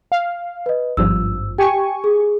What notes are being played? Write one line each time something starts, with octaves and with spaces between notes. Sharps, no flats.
F5
B4 D#5
G#1 G2 F3 E6
G4 G5 G#5 C#6
G#4